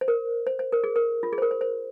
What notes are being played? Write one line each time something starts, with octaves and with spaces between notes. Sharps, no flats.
C5
A#4
C5
C5
A#4
G#4
A#4
F4
G#4
C5
A#4
C5
C5